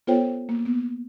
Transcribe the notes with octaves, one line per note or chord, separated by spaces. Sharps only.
B3 F4 A4 C5 C#5 G5
A#3
B3